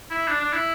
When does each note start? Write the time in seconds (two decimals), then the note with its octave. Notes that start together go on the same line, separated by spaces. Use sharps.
0.10 E4
0.28 D4
0.40 D4
0.53 E4